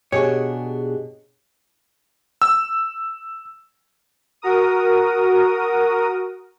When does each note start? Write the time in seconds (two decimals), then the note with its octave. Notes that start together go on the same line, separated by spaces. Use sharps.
0.12 B2 D4 G4 G#4 C#5
2.42 E6
4.42 F#4 A#4 D#6